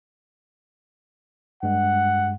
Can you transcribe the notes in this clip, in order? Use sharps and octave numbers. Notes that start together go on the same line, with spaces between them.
G2 G#3 F#5